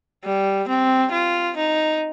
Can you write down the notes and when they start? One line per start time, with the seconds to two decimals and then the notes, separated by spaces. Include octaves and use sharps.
0.24 G3
0.68 C4
1.12 F4
1.57 D#4